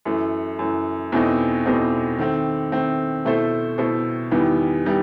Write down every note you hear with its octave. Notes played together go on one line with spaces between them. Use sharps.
F#2 E3 A3
F#2 E3 A3
E2 B2 A3 C4 D#4
E2 B2 A3 C4 D#4
D#3 A3 C4
D#3 A3 C4
B2 A3 E4 A4 C5
B2 A3 E4 A4 C5
E2 D#3 G3 B3 E4
D#3 G3 B3 E4